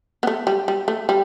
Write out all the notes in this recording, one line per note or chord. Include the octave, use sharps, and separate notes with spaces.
B3
A3
G3
G3
A3
G3